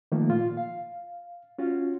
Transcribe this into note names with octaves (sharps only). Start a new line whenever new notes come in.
D#3 F3 A3 A#3
A#2 F4
F5
C#4 F4 F#4